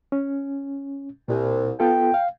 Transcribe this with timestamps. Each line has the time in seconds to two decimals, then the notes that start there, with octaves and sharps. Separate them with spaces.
0.12 C#4
1.28 C2 A#2
1.80 B3 F4 A4 G5
2.14 F5